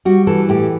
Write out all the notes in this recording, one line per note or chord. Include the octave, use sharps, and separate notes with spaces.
G3 F#4
E3 A4
A2 G4